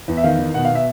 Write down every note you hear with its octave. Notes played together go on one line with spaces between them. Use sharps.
E2
E5
D#3 F5
D#3
B2 F#5
F5
B2
E5